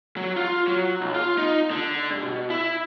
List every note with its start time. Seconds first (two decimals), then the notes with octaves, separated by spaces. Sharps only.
0.17 F#3
0.36 F4
0.67 F#3
1.01 B1
1.14 F4
1.38 D#4
1.71 D3
2.11 G2
2.22 B2
2.50 E4